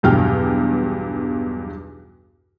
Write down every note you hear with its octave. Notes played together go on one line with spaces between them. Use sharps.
B1 E2 G2 G5 F6